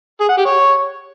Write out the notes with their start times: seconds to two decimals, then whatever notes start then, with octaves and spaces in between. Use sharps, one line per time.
0.20 G#4
0.29 F#5
0.37 G4
0.45 C#5